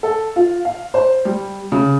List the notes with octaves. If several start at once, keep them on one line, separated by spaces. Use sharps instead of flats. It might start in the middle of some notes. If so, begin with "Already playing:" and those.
A4
F4
F5
C5
G3
C#3